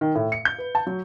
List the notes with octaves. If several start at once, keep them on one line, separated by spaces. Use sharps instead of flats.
D#3
A2
C#7
G6
B4
A5
F#3